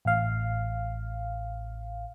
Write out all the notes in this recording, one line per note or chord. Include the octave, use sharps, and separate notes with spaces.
A1 F5